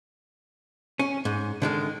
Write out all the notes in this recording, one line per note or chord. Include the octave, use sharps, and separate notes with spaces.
C#4
G#2
D3 D#3 G#3